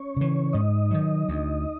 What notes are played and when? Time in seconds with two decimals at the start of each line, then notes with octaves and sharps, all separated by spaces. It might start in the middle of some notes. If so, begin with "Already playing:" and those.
Already playing: C#4 C#5
0.17 C#3 E3
0.53 G#2 D#4 D#5
0.91 D#3 F#3
1.29 D2